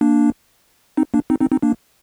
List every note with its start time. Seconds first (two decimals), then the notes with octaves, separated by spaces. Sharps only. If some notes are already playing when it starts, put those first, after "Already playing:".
0.01 A#3 D4
0.97 C4 D#4
1.14 A#3 D4
1.30 C4 D#4
1.40 C4 D#4
1.52 C4 D#4
1.62 A#3 D4